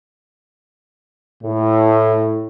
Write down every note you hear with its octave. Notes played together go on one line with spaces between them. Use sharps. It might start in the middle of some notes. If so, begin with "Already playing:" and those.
A2